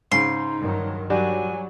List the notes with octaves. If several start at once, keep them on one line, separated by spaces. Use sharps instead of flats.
G#2 C#3 D#4 C6
G2 D#3 F#3
F#3 G3 D4 F#4 G#5